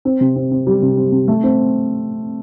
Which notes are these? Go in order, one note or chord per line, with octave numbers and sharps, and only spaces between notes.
C4
C3
C4
C4
G3
C3
C4
C3
A3
C4